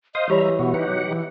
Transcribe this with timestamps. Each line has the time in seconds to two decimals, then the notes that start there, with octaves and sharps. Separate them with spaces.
0.15 C5 D#5 F5 D#6
0.30 E3 G3 G4 C#5 E5 A#5 B5
0.59 B2 B3 F#4
0.74 D#4 G4 B4 F#5
0.88 F#3
1.09 E3